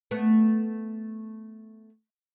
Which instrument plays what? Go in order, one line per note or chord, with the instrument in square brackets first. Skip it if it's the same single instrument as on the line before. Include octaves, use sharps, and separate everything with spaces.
[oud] A3 B3